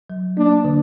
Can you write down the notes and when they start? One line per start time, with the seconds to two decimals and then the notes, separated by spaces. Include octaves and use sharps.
0.10 F#3
0.37 A#3 D4
0.65 D3